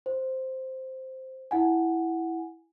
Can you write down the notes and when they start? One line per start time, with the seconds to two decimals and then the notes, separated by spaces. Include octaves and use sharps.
0.06 C5
1.51 E4 F#5 G#5